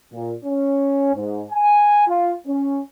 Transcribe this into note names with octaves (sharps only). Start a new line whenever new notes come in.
A#2
C#4
G#2
G#5
F4
C#4